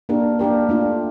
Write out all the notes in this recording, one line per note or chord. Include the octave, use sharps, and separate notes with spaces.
A#3 D4 G4 A#4
A#3 D4 G4 A#4
A3 D4 F4